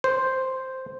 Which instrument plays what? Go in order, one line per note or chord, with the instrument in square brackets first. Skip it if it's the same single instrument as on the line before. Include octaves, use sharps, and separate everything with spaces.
[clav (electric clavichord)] C5